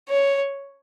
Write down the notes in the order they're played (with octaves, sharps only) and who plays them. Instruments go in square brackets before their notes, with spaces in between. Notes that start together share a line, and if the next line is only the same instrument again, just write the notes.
[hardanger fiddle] C#5